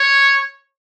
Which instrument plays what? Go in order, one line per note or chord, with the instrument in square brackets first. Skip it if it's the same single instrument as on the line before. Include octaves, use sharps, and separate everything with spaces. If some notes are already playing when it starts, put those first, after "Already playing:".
Already playing: [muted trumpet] C#5